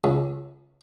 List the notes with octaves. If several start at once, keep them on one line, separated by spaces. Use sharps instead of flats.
C#2